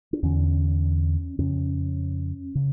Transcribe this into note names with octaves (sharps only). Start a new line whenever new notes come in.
D4
E2 D3 C#4
F2 C#3 C#4
C#3